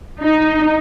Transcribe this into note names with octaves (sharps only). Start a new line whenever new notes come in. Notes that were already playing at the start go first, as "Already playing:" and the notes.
D#4